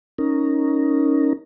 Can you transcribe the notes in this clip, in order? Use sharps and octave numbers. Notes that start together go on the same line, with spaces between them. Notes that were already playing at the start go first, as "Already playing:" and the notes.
C#4 D#4 A#4